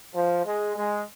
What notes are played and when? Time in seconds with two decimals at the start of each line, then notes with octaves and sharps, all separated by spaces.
0.13 F3
0.44 G#3
0.75 G#3